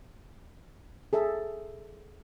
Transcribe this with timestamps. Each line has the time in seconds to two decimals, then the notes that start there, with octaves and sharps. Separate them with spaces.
1.13 G#4 A4 E5